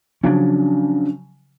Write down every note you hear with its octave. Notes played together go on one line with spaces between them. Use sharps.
C#3 F3 F#3 C#4 D4